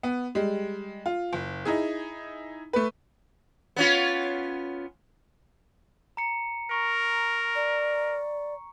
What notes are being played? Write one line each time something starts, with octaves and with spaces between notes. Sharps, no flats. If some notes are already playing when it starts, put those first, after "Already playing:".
B3
G3 G#3
F4
F#1
D#4 E4 G#4
A3 B4
B3 C#4 F4
A#5 C#7
A#4 C#6
D5